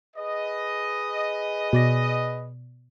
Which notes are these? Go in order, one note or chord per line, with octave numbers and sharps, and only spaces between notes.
G#4 B4 D#5
B2 D5 A#6